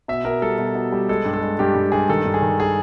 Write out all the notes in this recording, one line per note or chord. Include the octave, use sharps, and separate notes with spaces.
B2 E5
B2 A#4
G3 A4
B2
B2
G3
G#3 A4
G2
A4
G#3
G2 G4
G2
G2 G#4
D#3 A4
G2
G#4
D#3
G#4